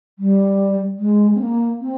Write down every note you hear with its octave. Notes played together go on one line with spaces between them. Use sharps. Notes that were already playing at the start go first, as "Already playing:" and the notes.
G3
G#3
C4
A#3
C4